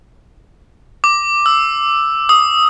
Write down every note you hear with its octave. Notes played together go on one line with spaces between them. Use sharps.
D6
E6
D#6